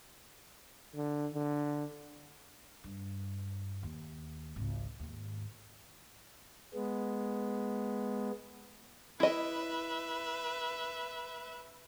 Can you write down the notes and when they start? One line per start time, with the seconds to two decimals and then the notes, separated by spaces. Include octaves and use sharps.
0.96 D3
1.34 D3
2.84 G2
3.83 D#2
4.56 G#1 C#2
5.00 D#2 G#2
6.74 G#3 B3
9.20 E4 B4 D#5 E5